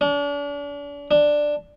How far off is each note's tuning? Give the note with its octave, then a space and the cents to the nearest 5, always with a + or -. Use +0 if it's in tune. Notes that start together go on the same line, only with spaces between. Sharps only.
D4 -40
D4 +5